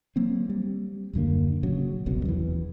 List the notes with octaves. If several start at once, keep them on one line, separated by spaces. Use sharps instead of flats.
F#3 A#3 C4
G3
D#1 F#2 D3 A#3
A#2 C#3 F#3
F#1 C2 F#2 B2
E2 E3